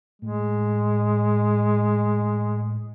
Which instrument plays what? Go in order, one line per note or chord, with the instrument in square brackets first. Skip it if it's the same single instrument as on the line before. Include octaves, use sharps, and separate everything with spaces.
[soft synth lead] A2 [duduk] G#3